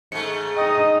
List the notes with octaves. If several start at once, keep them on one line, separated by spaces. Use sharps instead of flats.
G#2 A3 C#7
D#4 D#5 G5 D#6